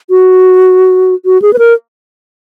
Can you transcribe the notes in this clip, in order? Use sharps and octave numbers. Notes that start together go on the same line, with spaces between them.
F#4
F#4
G#4
B4
A#4